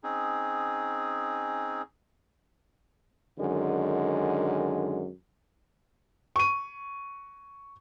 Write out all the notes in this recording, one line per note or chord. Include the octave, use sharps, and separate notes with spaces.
C4 C#4 D#4 G#4
F#2 D3 D#3 G#3
C#6 D#7